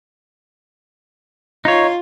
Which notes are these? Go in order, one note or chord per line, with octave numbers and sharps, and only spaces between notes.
D#4 F4 C#5